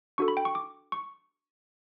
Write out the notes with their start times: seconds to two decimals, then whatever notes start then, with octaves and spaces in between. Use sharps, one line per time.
0.18 D4 F#4 A4 C#6
0.28 B5
0.37 G5
0.45 C#6
0.55 D6
0.92 C#6